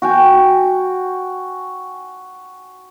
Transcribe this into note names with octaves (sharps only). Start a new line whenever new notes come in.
F#4 G5 G#5